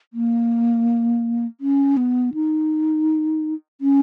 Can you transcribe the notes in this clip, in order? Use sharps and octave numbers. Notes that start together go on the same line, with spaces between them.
A#3
C#4
B3
D#4
C#4